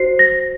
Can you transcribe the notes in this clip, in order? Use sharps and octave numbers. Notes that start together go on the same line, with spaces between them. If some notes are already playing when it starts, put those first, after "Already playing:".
Already playing: F#4 C5 C7
A#6